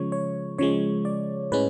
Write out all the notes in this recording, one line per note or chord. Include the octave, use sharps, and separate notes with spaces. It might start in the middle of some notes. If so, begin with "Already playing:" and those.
Already playing: C#3 F3 G#3 C#5
C#5
C#3 F3 G#3 C#5
D5
A2 G#3 C#4 B4